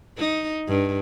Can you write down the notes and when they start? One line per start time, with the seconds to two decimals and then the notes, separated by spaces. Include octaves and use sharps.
0.18 D#4
0.68 G2